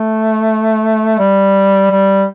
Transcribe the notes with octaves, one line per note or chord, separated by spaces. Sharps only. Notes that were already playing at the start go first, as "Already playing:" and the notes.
Already playing: A3
G3
G3